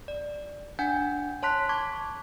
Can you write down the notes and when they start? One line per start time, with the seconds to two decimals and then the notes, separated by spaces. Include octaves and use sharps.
0.08 D5
0.79 D4 F#5 G#5 G6
1.43 C#5 A5 C6 F#6 B6
1.69 A5 C#6 D6 G#6 B6